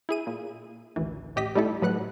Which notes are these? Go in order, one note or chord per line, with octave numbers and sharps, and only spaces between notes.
E4 G#4 D#7
A#2
A1 D2 D#3 E3
A1 G4 D#5 B6
G3 A3 D#4 E4 A4
A2 F#3 B4 F#5 F#6